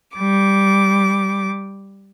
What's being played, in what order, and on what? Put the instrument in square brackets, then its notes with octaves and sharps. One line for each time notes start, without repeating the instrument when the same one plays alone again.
[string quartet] G3 D6